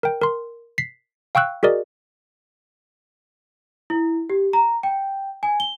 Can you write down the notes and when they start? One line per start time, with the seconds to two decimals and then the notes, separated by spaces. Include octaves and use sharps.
0.03 A#4 G5
0.21 A#4 C6
0.78 B6 C7
1.35 F5 G5 C#6 E6 F#6
1.63 F#4 G#4 A#4 D5 D#5
3.90 E4
4.30 G4
4.53 A#5
4.83 G5
5.43 G#5
5.60 G7